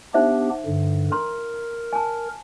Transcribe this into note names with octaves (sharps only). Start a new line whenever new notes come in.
B3 D4 D#4 G4 C5 E5
G2 D3
A#4 A#5 C6
G#5 A5